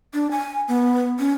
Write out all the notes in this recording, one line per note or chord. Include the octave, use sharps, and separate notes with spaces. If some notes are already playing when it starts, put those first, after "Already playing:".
D4
G#5
B3
C#4